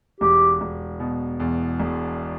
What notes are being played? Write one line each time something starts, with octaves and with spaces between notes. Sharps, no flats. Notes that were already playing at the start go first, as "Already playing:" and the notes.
E1 G4
E1
B2
E2
E1